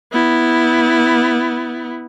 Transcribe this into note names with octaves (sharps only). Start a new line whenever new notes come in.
B3 E4